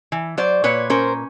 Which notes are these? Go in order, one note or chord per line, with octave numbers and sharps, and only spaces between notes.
E3
F#3 C5 D5
A#2 B4 C#5
C#4 A#4 C5